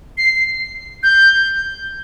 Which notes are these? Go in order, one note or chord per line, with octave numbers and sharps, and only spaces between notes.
C7
G6